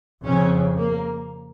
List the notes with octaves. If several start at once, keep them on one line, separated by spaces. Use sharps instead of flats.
F2 C#3 C#4
A#3